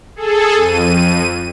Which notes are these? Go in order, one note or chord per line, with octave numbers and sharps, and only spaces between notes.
G#4 A4
F2 D#7